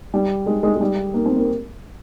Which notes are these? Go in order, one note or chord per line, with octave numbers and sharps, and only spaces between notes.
G3
G#3
G#3
G#3
G3
A#3
C4
A#3